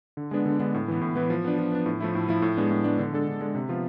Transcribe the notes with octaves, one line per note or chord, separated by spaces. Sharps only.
D3
G#3 B3 D4
D3
G#3 B3 D4
A2
E3 B3
A2
E3 B3
F3
B3 D4
F3
B3 D4
A2
F3 A3 E4
A2
F3 A3 E4
A2
G#3 B3 D4
A2
G#3 B3 D4
D3
G#3 D4 A4
D3
G#3 D4 A4
C3
F3 B3 F4